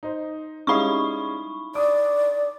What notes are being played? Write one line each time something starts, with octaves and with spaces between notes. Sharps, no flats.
D#4 C5
G3 G#3 C#4 D#4 E4 F5 B5 C#6
D5 D6 D#6